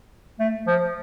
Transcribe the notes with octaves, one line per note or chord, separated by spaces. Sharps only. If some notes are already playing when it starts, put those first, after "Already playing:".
A3
F3